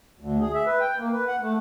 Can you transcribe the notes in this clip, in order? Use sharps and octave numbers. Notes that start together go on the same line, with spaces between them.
D2
G#4
E5
B4
G5
A#3
B4
F#5
A3